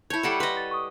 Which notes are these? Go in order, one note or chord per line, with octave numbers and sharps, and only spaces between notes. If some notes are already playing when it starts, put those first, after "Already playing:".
E4 C#5 A5 G6 G#6
G3 A4 F#5 C7 D7 E7
B4 D#5 C6
A6
C#6 D#6